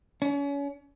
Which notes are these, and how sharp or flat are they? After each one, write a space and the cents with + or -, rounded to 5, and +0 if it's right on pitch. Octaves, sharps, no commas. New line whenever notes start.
C#4 +35